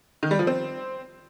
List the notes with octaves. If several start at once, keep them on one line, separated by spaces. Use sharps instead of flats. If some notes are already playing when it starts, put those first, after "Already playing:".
D#3
G3
F3
C4